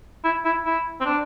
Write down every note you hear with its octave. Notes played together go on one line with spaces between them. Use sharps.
E4
E4
E4
C4
D4